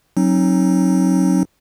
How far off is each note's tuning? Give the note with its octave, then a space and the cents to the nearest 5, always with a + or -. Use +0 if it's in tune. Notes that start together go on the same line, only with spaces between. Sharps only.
F#3 +0 C4 +45 D#4 +0